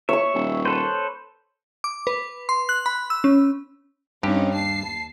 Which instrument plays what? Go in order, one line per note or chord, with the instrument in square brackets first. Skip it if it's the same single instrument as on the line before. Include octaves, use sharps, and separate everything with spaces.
[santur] C#5 C#6 [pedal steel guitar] E5
[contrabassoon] D#1
[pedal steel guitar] A4 B4 C5
[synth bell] D6
B4
C6
F#6
B5
E6
C#4
[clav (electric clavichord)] G2 G4 [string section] C4 C#4 D#4
[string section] D#2 A5 C7